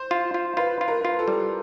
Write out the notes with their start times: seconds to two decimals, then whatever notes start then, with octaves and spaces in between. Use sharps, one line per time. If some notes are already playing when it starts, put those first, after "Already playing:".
Already playing: C5
0.11 F4
0.34 F4
0.57 F4 B4
0.81 F4
0.88 A#4
1.05 F4
1.19 A4
1.28 G3